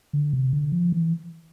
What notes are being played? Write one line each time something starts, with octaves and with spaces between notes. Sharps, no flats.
D3
C3
D3
F3
E3